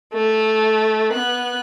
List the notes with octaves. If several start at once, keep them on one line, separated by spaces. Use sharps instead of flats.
A3
B3 F#6